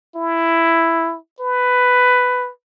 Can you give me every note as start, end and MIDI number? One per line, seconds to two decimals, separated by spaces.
0.16 1.17 64
1.40 2.50 71